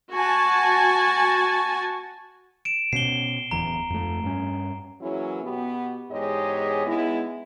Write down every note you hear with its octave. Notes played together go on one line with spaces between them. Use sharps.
F#4 G#5 A5
D7 E7
B2 C#4 C7 G7
D1 E2 E3 A#5
F2 A3
G2 C#4
E3 F#3 A#3 C#4 E4 G#4
B2 B3 F#4 G4
E2 G#2 G#3 G4 C#5 D#5
G#3 B3 D#4 E4